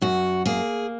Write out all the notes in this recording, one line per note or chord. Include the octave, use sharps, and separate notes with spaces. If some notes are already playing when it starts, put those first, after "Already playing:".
F#2 F#4
A#3 G#4